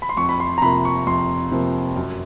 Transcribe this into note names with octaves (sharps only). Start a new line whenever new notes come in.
B5
C6
F2 C#6
B5
C6
A#5
C3 F3 A#3 B5
C#6
F2 C6
C3 F3 A#3
F#2